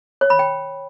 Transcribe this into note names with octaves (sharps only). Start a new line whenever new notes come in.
C#5
B5
G5